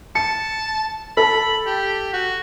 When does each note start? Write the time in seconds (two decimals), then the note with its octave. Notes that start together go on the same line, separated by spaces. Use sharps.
0.15 A5 C#7
1.17 A4 A5 B5
1.66 G4
2.14 F#4